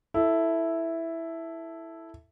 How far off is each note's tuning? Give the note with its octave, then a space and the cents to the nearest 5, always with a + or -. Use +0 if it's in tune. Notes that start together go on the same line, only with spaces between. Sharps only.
E4 +0 A4 +0